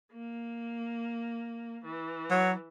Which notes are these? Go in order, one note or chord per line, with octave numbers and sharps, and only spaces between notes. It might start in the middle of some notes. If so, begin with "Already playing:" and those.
A#3
E3
F#3